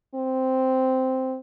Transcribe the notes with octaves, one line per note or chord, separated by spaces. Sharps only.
C4